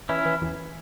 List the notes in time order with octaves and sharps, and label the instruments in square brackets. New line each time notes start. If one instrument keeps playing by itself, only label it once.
[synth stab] E3 [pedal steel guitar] C#4 E4
[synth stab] E3
E2